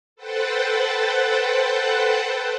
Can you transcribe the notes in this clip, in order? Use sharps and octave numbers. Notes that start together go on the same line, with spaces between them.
A4 B4 C5 F#5 G5 A5